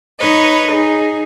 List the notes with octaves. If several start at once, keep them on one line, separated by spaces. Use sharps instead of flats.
D#4 B4 C#5 D#5
D#4 G#4